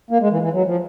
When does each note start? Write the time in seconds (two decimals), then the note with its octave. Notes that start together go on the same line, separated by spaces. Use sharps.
0.11 A#3
0.21 G#3
0.31 E3
0.42 E3
0.53 F#3
0.67 F3